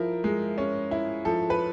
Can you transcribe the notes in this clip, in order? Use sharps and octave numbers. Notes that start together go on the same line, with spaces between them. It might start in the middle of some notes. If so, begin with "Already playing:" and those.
Already playing: F3 E4 A#4
G#3
C#4
E4
F3 A4
B4